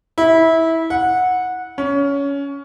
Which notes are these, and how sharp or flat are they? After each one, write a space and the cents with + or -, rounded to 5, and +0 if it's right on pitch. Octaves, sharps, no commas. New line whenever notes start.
E4 -20
F#5 -15
C#4 +20